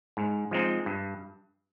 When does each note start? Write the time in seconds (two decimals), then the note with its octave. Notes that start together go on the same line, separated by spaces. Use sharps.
0.17 G#2
0.51 F3 G#3 C4 D#4
0.86 G2